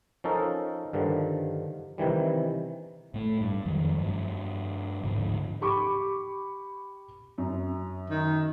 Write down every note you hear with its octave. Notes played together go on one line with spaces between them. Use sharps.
F3 C#4 D#4 A4 A#4
G2 D3 D#3 F3
C3 D#3 E3 G3
A2 A3
G2
F2 D#3 F3 F#3
G2 F3
D1 G#2 D3 F3
G4 B5 C#6 D6
F#2
D#3